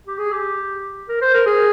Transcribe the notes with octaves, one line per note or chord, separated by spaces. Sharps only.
G4
G#4
G4
A#4
C5
A#4
G#4